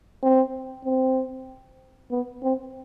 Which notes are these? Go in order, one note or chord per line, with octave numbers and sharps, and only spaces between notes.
C4
C4
B3
C4